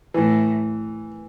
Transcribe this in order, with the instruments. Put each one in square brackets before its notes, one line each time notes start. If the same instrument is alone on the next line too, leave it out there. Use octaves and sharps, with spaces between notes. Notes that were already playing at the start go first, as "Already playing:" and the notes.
[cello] A2 [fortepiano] E3